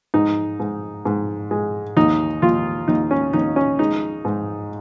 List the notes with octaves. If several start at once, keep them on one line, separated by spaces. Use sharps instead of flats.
G#2 D#4
G#2
G#2
G#3
D#2 D#4
D#2 F4
D#2 D#4
C#4
D#2 D#4
C#4
G#3 D#4
G#2